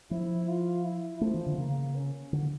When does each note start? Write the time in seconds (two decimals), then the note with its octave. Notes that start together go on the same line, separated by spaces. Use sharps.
0.11 F3 E4
0.48 F4
0.85 E4
1.21 F3 A3
1.34 E3
1.46 D3
1.58 C#3 A#3
1.95 C#4
2.33 D3